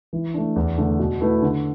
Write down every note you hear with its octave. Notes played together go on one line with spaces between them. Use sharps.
E3
A3 D4
E2
D3 A3
B2
A3 E4 B4
D3